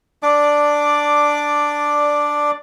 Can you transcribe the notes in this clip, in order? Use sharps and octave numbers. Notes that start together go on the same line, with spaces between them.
D4 D5 D6